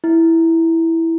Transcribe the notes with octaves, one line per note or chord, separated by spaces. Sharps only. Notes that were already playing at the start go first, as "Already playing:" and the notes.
E4